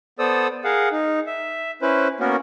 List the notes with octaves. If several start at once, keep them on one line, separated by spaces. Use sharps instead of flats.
B3 A4 C5 D5 D#6 E6
G#4 A#4 F5 F#5
D#4
E5
C#4 E4 B4 C5
A#3 B3 C#4 F#4 A#4